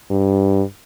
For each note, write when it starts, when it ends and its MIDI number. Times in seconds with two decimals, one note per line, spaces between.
0.10 0.63 43